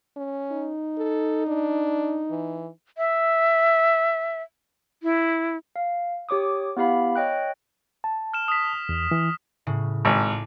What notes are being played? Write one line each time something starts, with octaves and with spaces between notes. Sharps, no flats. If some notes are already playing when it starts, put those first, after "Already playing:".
C#4
D#4
A4
D4
E3
E5
E4
F5
G4 C#5 D6 D#6
B3 E4 G4 F5 B5
C#5 D#5 G5 F#6
A5
F6 E7
D#6 B6
E2
E3
A2 C#3
G#1 A5 D6